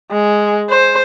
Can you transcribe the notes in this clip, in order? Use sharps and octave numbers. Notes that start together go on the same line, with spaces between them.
G#3
C5